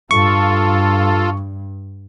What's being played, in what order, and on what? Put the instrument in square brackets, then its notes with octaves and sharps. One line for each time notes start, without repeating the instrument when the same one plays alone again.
[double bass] G2 [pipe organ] F4 A4 [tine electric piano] C#6